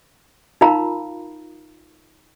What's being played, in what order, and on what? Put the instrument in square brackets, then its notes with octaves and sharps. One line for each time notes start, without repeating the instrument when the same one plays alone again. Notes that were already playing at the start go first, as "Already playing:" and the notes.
[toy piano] D#4 F4 A#4 F5 A#5 B5